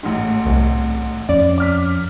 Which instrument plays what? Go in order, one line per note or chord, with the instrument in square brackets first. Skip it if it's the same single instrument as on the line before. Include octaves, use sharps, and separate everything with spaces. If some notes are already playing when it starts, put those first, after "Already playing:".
[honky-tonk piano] A1 G#2
[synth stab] C2
[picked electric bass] F2 C#4 [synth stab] D5
[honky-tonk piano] D6 F6 B6